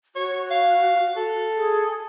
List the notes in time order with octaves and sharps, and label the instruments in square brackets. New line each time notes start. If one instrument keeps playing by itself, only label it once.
[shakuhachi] F#4 [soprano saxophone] C#5
[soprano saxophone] F5
A4
[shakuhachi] G#4